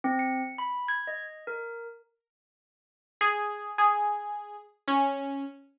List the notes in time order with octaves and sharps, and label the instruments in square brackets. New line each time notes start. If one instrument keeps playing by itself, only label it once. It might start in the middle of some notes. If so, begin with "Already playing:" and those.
[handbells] C4
C#7
B5
G#6
D#5
A#4
[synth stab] G#4
G#4
C#4